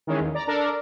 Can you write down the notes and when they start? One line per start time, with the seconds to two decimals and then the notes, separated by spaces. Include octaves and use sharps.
0.07 D#3 E3 G#3 C#4
0.20 D#2
0.34 D5 A#5
0.47 D4 A4 A#4 D5